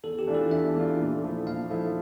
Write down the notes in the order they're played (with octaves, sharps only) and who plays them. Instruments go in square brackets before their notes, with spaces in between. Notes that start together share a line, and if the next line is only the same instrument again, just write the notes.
[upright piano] E2 [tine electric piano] A4
[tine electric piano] G4
[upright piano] E3 A3 D4 F4
[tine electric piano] A4
[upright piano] E2 [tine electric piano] E5
[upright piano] E3 A3 D4 F4
A#2
F3 A3 E4
[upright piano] A#2 [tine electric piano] F5
[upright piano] F3 A3 E4